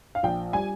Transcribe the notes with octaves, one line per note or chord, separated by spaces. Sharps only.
F5
A#1 G5
G3 G#5